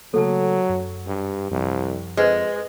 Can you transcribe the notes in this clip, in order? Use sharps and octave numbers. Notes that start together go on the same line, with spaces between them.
C#3 F#3 A3 A#3 A4 A5
F#2
G2
C2 F#2 F3
F2 G#3 B4 C5